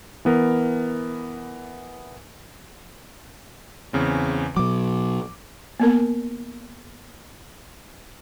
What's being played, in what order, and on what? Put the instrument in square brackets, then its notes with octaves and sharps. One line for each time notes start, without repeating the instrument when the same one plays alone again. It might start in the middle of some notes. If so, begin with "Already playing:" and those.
[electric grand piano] E3 B3 A#4
E2 C#3 C4
[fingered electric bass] B2 F#3 [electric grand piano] D6
[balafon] A#3 B3 A#4